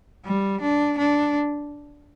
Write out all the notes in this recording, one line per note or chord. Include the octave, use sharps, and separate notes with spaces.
G3
D4
D4